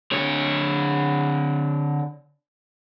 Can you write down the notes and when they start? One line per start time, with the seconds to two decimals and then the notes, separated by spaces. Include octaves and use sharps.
0.12 D3 C#5